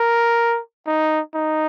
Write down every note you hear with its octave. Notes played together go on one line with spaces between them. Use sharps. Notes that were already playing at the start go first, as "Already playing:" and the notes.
Already playing: A#4
D#4
D#4